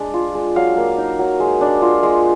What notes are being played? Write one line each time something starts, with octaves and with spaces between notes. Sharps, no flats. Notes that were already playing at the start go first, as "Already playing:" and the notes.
Already playing: G#3 D4
F4
G#3
F#3 F5
A#3
D#4
F#3
G#3
D4
F4
G#3